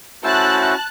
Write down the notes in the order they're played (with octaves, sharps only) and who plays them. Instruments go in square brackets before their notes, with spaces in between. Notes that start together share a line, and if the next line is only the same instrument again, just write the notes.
[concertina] A3 C5 E6 [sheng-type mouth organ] C#4 E4 F#4 [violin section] A5 F#6